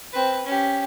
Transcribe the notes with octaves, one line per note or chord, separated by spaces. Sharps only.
C4 B4
C#4 G4